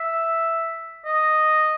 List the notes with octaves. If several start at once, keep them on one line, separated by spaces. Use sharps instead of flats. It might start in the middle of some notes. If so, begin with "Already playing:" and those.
Already playing: E5
D#5